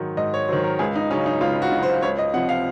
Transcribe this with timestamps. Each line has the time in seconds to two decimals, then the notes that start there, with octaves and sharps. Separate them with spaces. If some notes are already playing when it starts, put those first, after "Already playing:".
Already playing: G#2 D#3 F#3
0.17 G#2 D#5
0.34 C#5
0.48 D#3 F#3 C5
0.64 A#4
0.79 C#2 G#4
0.95 D#4
1.11 C#3 F#3 C#4
1.26 D#4
1.41 C#2 F4
1.62 F#4
1.72 C#3 F#3
1.83 C5
2.02 C#2 C#5
2.18 D#5
2.34 C3 F#5
2.36 F3
2.49 F5